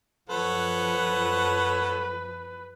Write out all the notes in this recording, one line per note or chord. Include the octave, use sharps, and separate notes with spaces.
F#2 F3 A4 B4 C#5 F#5